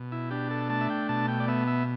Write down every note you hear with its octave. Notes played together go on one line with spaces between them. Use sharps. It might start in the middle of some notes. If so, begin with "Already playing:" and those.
Already playing: B2
E4
D4 G4
A4
A3 A5
E5
G5
B2 A5
G5
D5
B3 E5
E5